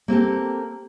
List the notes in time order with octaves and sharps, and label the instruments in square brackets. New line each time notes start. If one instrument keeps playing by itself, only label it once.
[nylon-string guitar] A#3 C4 G4 A4